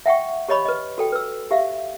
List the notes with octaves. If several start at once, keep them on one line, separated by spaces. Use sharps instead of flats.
E5 F#5 G5 C#6
G4 C#5 D#5 B5 C#6
B4 D#5
F#4 A4 G5
B4 E6
G4 E5 F5